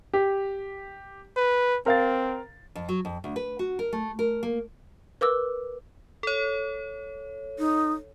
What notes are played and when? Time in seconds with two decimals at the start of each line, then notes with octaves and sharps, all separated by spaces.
0.13 G4
1.37 B4
1.86 C4 A#4 F5 A6
2.75 F2
2.89 F#3
3.05 F2
3.24 D2
3.36 B4
3.59 F#4
3.79 A#4
3.93 A3
4.19 A#4
4.43 A#3
5.21 A#4 B4 D6 E6
6.23 A4 C#5
7.59 D#4